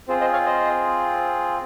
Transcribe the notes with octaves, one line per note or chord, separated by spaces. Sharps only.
C4 F4 G#4 C5
C5 D#5
C#5 F5
C5 D#5